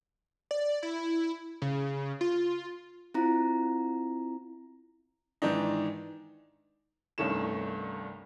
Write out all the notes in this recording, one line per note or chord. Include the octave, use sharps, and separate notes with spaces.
D5
E4
C#3
F4
C4 E4 F4 A#5
G#2 D#3 E3 D4 D#4
C2 G2 D#3 A3 C#4 E7